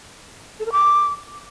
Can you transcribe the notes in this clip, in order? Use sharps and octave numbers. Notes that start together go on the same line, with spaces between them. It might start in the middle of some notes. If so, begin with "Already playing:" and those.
A4
A#4
D6